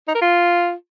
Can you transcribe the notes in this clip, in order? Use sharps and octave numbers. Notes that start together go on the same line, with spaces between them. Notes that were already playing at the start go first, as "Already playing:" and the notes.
D#4
A#4
F4